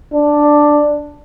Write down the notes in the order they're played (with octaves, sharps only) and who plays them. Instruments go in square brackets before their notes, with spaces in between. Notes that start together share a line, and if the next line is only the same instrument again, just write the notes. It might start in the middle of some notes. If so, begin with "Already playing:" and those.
[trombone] D4